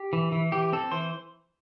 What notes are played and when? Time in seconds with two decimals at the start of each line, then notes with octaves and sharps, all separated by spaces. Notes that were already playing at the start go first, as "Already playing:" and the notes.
Already playing: G4
0.13 E3
0.32 E3
0.52 E3 G4
0.72 C4 A4
0.91 E3 C5